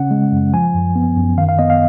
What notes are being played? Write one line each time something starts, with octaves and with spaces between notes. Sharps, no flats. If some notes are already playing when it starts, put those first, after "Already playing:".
Already playing: C#3 C#4 F#5
G#3
F#2
F3 G#5
F#2
B3
F#2
D#3 F5
F5
B3 D#5
F5